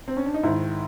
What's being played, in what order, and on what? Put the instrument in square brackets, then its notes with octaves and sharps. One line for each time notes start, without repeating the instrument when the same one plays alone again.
[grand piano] C4
C#4
D4
D#4
G#2 D#3 E4